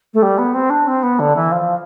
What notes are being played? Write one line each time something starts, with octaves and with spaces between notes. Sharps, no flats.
A3
G3
B3
C4
D4
C4
B3
D3
E3
F3